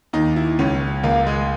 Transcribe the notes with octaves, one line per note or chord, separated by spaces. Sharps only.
D#2 D#4
E4
C#2 C#4
C#2 A#3
G#3